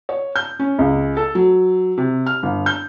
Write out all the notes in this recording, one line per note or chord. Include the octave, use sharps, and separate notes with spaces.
C#5
G6
C#4
C#2
A4
F#3
C3
F6
G1
G6